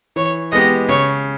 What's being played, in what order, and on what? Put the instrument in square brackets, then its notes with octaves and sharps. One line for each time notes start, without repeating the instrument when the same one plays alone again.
[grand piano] E3 [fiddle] C#5
[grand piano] G#3 B3 G4 [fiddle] D#5
[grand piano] C#3 [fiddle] C#5